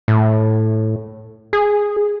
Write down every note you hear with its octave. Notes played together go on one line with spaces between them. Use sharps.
A2
G#4